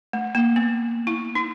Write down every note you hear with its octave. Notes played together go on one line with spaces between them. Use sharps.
A3
A#3
B3
E4
D#4